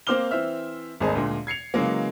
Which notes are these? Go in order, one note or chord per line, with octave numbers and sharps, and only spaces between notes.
A#3 C4 C5 D6 F6 G7
E3 C4 C5 E5 F6
G#1 D#2 A3 C4 G#4 D#5
D2 A#2 G#3
G#6 C7 C#7 F7
C#3 E3 F#3 G#3 A#3